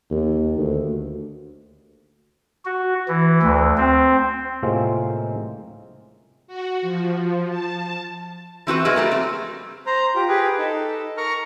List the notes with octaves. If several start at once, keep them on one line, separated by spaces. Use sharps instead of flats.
D#2
D2
F#4
E3
D2
C4
A2 C3 G#3 A#3 C4 F4
F#4
F3
A5
E3 C4 F#4 B4
F3 G#3 B3 F#4
G3 A3 A#3
C4
C5 A#5
F4 G4
G4 G#4 B4
D#4 A4
A#4 A#5 C#6 F6